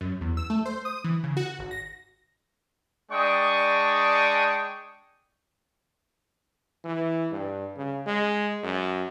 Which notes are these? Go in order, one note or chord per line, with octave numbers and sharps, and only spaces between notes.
F#2
E2
E6
A3
C5
D#6
E3
C#3
F#4
G#1
A#6
G#3 D4 D5 G5 C#6 D#6
E3
G2
C#3
G#3
F#2